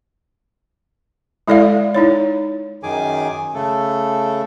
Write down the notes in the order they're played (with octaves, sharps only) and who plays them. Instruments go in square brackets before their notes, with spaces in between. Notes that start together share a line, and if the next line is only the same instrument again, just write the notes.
[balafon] G#3 E4 A4 D5 E5 F5
D#4 E4 C#5
[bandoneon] F#2 D#3 G#4 G#5 D6
C#3 A3 A4